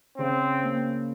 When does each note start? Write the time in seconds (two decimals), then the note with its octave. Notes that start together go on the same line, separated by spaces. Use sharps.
0.18 C#3 C4
0.63 A#3